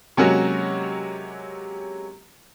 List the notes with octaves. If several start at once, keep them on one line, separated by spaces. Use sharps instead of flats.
C3 F#3 G#3 A#3 C#4 F#4